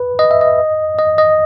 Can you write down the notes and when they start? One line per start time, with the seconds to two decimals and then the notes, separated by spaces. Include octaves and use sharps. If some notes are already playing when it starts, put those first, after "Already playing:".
Already playing: B4
0.19 D#5
0.31 E5
0.41 D#5
0.99 D#5
1.18 D#5